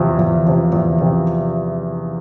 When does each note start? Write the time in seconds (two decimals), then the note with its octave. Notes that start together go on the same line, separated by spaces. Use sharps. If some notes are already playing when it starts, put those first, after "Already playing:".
Already playing: E2 C3 F3
0.19 E2
0.45 C3 F3
0.73 E2
1.01 C3 F3